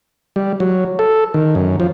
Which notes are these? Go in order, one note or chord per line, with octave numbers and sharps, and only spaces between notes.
G3
F#3
A4
D#3
F#2
F3